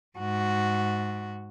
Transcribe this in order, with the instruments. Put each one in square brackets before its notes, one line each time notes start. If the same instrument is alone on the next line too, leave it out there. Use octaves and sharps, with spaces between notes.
[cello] G#2 F#4